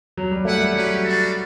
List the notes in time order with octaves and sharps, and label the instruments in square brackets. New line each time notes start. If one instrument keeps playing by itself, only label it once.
[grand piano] F#3
G3
[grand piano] A3 [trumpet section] E4 G4 B4 F#5
[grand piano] G3
[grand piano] F#3 [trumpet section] C#4 G4 B4 F#5
[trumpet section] G3 D4 F#4 A4